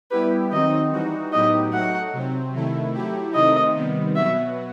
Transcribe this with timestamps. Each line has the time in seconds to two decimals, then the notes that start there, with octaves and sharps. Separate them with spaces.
0.11 G3 B3 E4 G4 B4
0.51 D#3 F#3 C4 D#4 D#5
0.92 E3 G3 D#4 F#4
1.32 A2 F#3 B3 D#4 G4 D#5
1.72 F#3 A3 D#4 F#4 F#5
2.13 C3 F#3 C4
2.53 C3 D#3 A3 E4
2.94 F#3 A3 E4 G4
3.34 C3 D#3 A3 C4 D#4 D#5
3.75 C3 D#3 G3 B3
4.15 B2 F#3 B3 F#4 E5